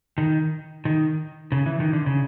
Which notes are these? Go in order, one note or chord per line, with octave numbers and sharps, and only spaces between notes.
D#3
D#3
C#3
E3
D#3
D3
C#3